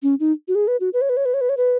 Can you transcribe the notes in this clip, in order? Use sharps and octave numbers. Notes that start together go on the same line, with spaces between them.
C#4
D#4
F#4
G#4
B4
F#4
B4
C#5
B4
C#5
B4
C#5
B4
C#5
B4